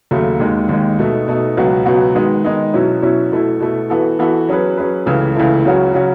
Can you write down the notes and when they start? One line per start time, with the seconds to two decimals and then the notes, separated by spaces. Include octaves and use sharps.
0.11 D#2 C#3 F#3 A3
0.40 D#2 D#3 G#3
0.69 D#2 D#3 G#3
0.99 B2 A3 D#4
1.28 B2 A3 D#4
1.57 C#2 B2 F#3 B3 F#4
1.85 C#2 B2 F#3 B3 F#4
2.15 D#3 G#3 B3 D#4
2.44 D#3 G#3 B3 D#4
2.73 B2 F#3 C#4 E4
3.02 B2 F#3 C#4 E4
3.32 B2 A3 E4
3.60 B2 A3 E4
3.90 E3 B3 F#4 A4
4.19 E3 B3 F#4 A4
4.49 F#3 C#4 G#4 B4
4.77 F#3 C#4 G#4 B4
5.06 C#2 C#3 E3 A3 E4
5.36 C#2 C#3 E3 A3 E4
5.65 C#2 C#3 F#3 C#4 F#4
5.94 C#3 F#3 C#4 F#4